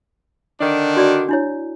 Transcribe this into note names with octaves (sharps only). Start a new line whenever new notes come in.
D3 D#3 D4
F#4 D5 E6
D4 E4 C#5